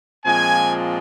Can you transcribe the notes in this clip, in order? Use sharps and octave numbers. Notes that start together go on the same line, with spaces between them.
A#2 F3 G#3 C4 G#5